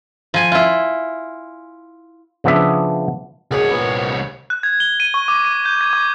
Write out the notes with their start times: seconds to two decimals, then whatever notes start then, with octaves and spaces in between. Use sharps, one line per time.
0.34 F3 G#5
0.52 E4 F4
2.44 C#3 F3 B3 D4 E5
3.51 C2 F#2 G#4 C#5 D5
3.70 A#2 B3
4.50 F#6
4.63 G#6
4.80 G7
5.00 D#7
5.14 C#6
5.28 D6
5.45 D#7
5.65 G6
5.81 G#6
5.93 D6